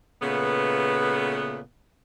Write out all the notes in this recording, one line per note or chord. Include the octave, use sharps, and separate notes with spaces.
A#2 C#3 A3 B3